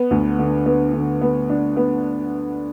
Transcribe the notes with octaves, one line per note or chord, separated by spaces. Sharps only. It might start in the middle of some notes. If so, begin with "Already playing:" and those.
Already playing: B3
D2
D3
B3
D3
B3
D4
B3